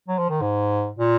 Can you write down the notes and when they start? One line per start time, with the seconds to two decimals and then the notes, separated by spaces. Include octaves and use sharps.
0.08 F#3
0.19 F3
0.30 D#3
0.41 G#2
0.99 A#2